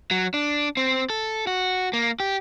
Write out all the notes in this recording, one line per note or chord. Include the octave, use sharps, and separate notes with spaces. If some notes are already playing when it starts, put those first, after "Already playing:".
F#3
D4
C4
A4
F#4
A#3
G4